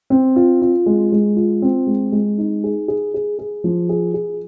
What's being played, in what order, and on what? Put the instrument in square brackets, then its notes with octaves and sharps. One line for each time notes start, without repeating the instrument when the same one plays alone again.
[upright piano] C4
F4
F4
G#3
G#3
F4
C4
G#3
G#3
D#4
G#4
G#4
G#4
G#4
F3
G#4
G#4